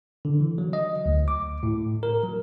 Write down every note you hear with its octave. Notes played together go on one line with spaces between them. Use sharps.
D3
E3
F#3
D#5
D2
D6
A2
A#4
F#3